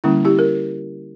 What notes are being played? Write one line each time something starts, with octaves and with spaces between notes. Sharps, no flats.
D3 G3 A#3 C#4 E4
E4 G4
A#4